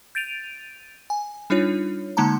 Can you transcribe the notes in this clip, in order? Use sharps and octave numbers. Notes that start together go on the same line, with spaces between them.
G6 A6 D7 D#7 F7
G#5
G3 D4 D#4 F4 C#5
D3 G#3 A#3 D#4 A5 A#5